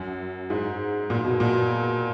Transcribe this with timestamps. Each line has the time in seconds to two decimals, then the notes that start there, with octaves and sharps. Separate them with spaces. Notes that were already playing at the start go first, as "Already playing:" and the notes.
Already playing: F#2
0.50 G#2
1.10 A#2
1.24 B2
1.40 A#2